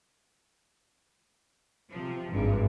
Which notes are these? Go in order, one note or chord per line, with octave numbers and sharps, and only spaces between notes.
C3 F3
G#1 G2